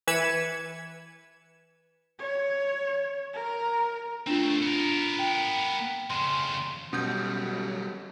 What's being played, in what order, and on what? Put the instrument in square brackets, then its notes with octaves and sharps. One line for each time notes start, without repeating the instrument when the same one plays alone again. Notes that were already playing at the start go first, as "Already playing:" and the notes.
[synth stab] E3 B4 G#6 C#7 E7
[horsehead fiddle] C#5
A#4
[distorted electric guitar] A3 C4 [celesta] D4 F4
[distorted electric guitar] B3 A#4
[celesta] G5
[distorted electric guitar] F2 C#3 [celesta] C6
[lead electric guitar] B1 G3 [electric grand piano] B2 G6 [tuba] F#3 [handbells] C#4